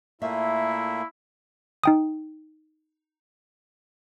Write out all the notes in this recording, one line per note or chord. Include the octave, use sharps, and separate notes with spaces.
A#2 A3 A#3 E4 E5
D#4 G5 D#6